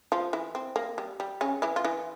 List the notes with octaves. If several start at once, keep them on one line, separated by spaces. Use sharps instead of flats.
F3 F4
E3 E4
C4
A#3
G3
G3
C#3 C#4
E3 E4
F4
E3 E4